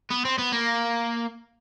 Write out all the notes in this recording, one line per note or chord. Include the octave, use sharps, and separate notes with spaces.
B3
C4
B3
A#3